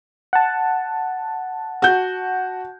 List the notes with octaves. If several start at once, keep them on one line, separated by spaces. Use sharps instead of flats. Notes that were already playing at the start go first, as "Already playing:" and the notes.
F#5 A5
F#4 G6